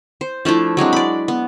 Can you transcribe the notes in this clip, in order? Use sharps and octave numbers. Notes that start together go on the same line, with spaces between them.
C5
F3 A3 D4 E4
F#3 G#3 C4 D4
D5 B5
B3